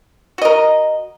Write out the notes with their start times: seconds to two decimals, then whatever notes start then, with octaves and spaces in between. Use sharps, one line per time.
0.38 F#4
0.42 D#5
0.45 A#4